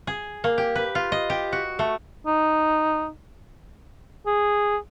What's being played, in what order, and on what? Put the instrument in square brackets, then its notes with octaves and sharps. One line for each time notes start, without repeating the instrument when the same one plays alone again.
[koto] G#4
A#3
G4
B4
F4
D#5
G4
F#4
A3
[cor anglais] D#4
G#4